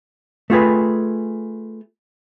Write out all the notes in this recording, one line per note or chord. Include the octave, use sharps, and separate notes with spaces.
A3 F4 G#4 B4